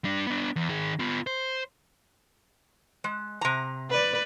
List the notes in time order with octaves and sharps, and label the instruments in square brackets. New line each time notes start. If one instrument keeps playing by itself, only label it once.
[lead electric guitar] G3 D4
B3 D4
E2
D#3 G#4
B3 F4
C5
[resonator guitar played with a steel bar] G#3
C3 A#5
[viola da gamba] B4 D5